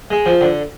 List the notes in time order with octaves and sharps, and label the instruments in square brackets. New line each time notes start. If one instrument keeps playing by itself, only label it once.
[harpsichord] G#3
F3
D3